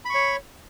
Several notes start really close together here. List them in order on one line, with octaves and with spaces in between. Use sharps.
B5 C#6 C#5